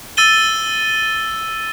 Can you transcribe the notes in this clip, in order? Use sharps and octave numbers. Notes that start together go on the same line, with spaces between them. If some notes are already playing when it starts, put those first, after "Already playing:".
E6 A6 D#7 G7